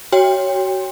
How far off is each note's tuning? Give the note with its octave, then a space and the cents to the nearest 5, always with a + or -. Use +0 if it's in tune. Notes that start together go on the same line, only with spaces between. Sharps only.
F#4 +30 C#5 +0 G5 +25